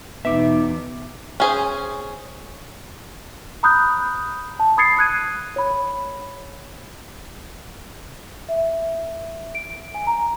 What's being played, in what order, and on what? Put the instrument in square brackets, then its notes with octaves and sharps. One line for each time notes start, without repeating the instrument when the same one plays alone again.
[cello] E2 B2 [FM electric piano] B3 D6 [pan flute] D#4 [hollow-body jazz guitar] E5
[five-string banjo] C#4 G#4 C5
[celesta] A#5 B5 D#6 F#6 G6
A5
B5 D#6 G#6 A6 C7 C#7
D#6 F#6 G#6 D#7
C#5 B5
E5
D7
G#5
A#5